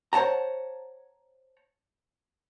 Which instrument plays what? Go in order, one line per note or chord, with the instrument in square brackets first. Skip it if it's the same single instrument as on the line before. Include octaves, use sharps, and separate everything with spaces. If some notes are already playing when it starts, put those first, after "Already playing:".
[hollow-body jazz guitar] C5 C#5 F#5 A5 A#5